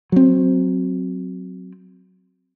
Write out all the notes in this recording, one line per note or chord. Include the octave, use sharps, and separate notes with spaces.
F#3 C4